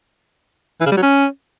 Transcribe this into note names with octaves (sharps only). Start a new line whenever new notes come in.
E3
C#3
G3
F#3
C#4